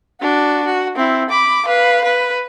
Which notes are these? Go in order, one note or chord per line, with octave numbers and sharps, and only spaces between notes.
D4 F#4
F#4
C4 E4
B5 D6
B4 F5
B4